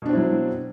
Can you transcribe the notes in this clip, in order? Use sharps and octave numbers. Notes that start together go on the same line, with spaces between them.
B2 F#3 C4 D4 E4